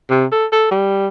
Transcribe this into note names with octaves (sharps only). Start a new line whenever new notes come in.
C3
A4
A4
G3